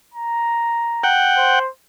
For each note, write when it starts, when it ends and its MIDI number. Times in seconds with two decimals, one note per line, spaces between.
0.14 1.09 82
1.04 1.59 78
1.04 1.59 79
1.37 1.69 72